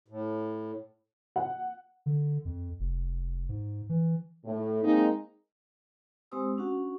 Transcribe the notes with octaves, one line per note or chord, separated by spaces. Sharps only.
A2
F#5
D3
F2
F1
G#2
E3
A2
G#3 A#3 C4 D#4
G#3 C4 G4 C5 D#6 E6
C#4 D4 F#4 F#5